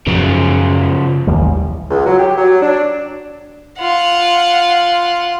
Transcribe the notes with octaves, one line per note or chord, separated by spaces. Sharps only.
F#2 C#3 F3
A1 D#2 G3
C#2
F#3
G4
F#3
D4
F4 F#5